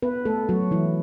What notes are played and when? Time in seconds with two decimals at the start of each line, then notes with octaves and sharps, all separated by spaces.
0.03 B3 B4
0.25 A3 A4
0.49 F#3 F#4
0.71 E3 E4